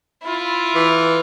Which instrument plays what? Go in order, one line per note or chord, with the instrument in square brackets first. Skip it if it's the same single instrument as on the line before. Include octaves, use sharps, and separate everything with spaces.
[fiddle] E4 F4
[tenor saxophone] E3